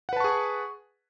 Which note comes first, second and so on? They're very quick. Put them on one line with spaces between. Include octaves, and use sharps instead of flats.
F#5 B4 A5 C#6 G#4